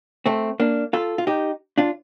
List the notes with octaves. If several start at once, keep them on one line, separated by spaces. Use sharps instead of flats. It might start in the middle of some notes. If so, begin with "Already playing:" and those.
A3 C4
A#3 D4
F4 A4
F4
D#4 G4
D4 F4